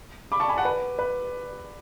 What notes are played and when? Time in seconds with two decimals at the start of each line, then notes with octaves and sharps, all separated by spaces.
0.32 B5 D6
0.40 A5 C#6
0.49 G#5 B5
0.56 F#5 A5
0.65 B4
0.99 B4